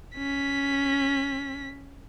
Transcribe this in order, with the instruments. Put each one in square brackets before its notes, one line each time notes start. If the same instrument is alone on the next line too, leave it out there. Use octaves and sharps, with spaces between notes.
[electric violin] C#4 B6